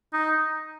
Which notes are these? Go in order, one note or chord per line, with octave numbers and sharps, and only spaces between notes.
D#4